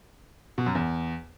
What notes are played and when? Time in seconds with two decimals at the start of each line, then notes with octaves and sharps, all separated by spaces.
0.58 B2
0.66 F#2
0.75 E2